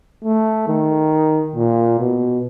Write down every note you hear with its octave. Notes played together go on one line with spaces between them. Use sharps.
A3
D#3
A#2
B2